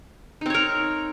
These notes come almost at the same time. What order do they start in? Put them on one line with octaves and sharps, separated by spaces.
D#4 C4 C#5 A#4